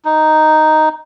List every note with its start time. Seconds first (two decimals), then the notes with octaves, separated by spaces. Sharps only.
0.05 D#4